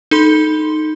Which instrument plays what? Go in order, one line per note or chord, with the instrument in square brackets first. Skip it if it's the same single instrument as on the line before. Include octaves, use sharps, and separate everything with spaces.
[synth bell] D#4 A4 B5 C6 G7